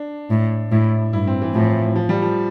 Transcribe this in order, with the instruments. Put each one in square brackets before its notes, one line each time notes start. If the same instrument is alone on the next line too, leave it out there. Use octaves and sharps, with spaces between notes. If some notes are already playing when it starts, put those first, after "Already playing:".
Already playing: [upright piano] D4
[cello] A2
[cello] A2 [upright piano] E4
[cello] G2 [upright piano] E4
[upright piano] C4
E3
[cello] A2 [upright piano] F3
[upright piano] F3
G3
F3